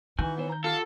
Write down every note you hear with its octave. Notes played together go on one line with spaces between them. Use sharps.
D#3 E3 F#4 G#5 G6
B3 C5 C#5
A#5 G6
F4 G4 A4 F5 F#5